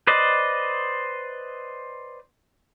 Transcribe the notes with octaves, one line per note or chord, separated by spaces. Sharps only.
B4 C5 D5 D#5